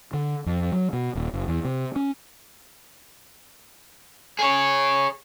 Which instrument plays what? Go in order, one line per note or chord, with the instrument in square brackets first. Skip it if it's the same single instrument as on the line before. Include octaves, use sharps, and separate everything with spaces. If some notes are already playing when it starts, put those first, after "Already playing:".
[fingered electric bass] D3
F2
F#3
B2
D#1
F#1
E2
C3
C#4
[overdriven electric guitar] G#4 C#5